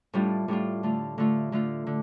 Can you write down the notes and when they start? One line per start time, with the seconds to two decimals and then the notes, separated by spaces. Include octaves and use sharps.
0.13 A2 G3 D4 F4
0.48 A2 G3 D4 F4
0.83 D3 A3 F4
1.18 D3 A3 F4
1.52 D3 A3 F4
1.87 D3